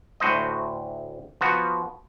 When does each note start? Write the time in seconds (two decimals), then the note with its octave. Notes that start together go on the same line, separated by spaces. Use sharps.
0.20 D2 A2 F#4 C5 D#5
1.41 F3 B3 F#4